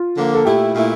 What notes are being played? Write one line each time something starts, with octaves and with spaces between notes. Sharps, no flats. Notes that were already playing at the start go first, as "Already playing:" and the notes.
Already playing: F4
D3 F3 A#3
A4
A#2 A3 E4 G4
A#2 A3 E4